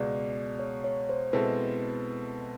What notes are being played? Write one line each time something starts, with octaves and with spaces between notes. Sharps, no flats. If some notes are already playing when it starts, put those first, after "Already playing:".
Already playing: C#2 B2 G#3 D5
C#5
C#5
C5
B2 G#3 C4 E4 A4 B4